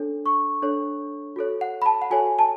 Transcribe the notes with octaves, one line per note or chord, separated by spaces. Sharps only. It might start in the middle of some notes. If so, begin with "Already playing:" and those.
Already playing: D4 A4 C#5
C#6
D4 A4 C#5
F#4 A4 C#5
F#5
B5
A5
F#5
F#4 A4 C#5 G#5
A5